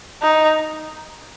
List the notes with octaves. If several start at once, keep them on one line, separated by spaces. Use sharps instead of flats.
D#4